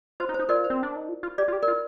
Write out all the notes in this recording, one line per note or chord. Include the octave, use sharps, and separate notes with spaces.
F4 C5
D#4
C5
D#4
F4 A#4 D5
C5
C4
D4
D#4
F4
F4
G4 D5
F4
G4
A#4 D5
F4